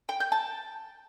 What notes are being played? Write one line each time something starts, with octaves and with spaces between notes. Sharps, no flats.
G5
G6
A5